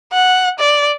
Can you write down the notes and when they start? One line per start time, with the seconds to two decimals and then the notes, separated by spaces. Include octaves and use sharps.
0.13 F#5
0.59 D5